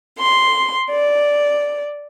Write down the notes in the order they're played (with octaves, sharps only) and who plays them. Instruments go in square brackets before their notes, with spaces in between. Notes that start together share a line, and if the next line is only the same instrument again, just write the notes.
[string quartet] C6
D5